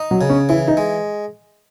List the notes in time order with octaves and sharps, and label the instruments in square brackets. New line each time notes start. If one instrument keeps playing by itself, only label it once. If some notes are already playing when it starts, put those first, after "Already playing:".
Already playing: [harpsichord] D#4
[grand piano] F#3
[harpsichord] C#3
[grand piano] C#4
[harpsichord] E3 [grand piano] E4
[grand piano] D#4
[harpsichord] G#3